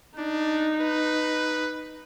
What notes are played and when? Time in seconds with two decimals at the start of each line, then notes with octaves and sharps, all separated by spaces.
0.18 D4 D#4
0.81 B4